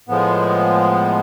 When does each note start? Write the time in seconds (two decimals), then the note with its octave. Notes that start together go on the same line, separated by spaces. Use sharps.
0.08 A2 F3 G#3 B3